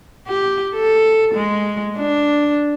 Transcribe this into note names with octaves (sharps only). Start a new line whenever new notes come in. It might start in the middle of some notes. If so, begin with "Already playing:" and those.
G4
A4
G#3
D4